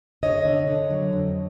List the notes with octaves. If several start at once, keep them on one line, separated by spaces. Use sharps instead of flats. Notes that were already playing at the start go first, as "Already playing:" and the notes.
D3 C#5 D#5
D3
D3
F#3
F2